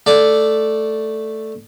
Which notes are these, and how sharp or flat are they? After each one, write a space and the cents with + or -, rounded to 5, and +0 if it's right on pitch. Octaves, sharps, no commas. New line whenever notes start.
A3 +0 D5 +0